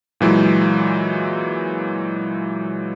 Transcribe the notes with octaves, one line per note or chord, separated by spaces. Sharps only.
A#2 E3 F#3 G#3